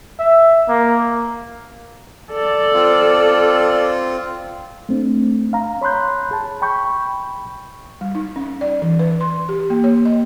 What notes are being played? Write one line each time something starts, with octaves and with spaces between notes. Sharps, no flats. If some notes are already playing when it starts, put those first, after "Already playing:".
E5
A#3
A4 D5
C4 F4
A3 C4 D4
F5 A#5
C#5 B5 C6 F#6 G6
G#4 A5
G5 B5 C#6 G6
G3
D#4
C#4
D5
E3
B4
C6
G4
A#3
C#5
D#5